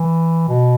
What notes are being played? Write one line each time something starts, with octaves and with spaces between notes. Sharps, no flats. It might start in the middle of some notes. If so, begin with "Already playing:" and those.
Already playing: E3
B2